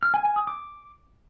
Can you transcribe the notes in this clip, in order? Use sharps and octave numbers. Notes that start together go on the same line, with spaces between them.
F6
G#5
G#5
D#6
D6